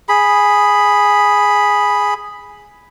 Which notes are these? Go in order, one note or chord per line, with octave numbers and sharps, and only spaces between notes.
G#4 B5